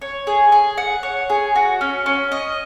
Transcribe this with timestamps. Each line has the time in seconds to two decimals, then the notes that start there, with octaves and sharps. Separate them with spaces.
0.01 C#5
0.27 G#4
0.52 G#4
0.78 F#5
1.03 C#5
1.30 G#4
1.56 F#4
1.81 C#4
2.06 C#4
2.32 D#5